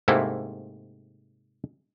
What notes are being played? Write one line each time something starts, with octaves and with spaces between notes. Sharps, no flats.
G#2 C3 A3 A#3 E4